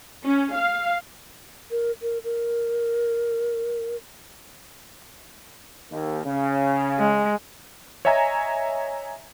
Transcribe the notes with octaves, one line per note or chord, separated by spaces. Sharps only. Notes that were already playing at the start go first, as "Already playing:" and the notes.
C#4
F5
A#4
A#4
A#4
D#2
C#3
G#3
C#5 D#5 E5 G#5 A#5 G#6